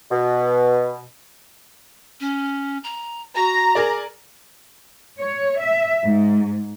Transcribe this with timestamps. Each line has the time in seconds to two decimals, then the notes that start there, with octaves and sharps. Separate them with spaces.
0.11 B2
2.20 C#4
2.84 A#5
3.35 F#4 A#5
3.75 G#4 A#4 D5
5.20 C#5
5.59 E5
6.04 G#2